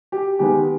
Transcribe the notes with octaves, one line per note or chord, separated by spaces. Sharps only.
G4
D#3 G#3 B3 G4